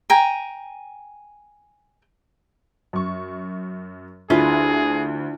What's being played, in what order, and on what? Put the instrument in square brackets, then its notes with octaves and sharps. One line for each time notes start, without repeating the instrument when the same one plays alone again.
[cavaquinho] G5 G#5 A#5
[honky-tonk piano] F#2 C#6
[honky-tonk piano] D2 [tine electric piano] D4 [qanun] E4 F4 B4 [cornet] G#4